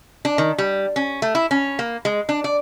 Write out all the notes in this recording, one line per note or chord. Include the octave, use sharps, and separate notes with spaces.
D4
D#3
G3
C#4
A3
E4
C#4
A#3
G#3
D4
D5